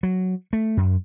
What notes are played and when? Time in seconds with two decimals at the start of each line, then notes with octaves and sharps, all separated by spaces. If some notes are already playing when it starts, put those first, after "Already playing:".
0.03 F#3
0.53 A3
0.77 F#2